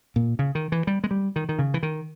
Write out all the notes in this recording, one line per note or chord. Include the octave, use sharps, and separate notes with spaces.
A#2
C#3
D#3
E3
G3
G#3
G3
D#3
D#3
C#3
E3
D#3